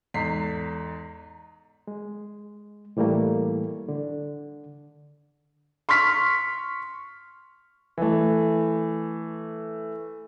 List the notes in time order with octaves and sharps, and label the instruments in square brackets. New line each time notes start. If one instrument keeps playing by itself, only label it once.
[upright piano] E2 G#2 A4 B6 C7
[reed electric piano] G#3
A2 E3 G3 A3 A#3
D3
[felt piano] C6 C#6 F6 B6
[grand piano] E3 A3